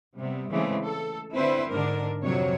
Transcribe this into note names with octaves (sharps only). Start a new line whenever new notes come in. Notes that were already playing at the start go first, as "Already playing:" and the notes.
C3 G3 B3
C#3 E3 G#3 A3 C4
A4
D3 C4 E4 B4 C5
G#2 D3 D4 A#4
F2 C3 F#3 C#5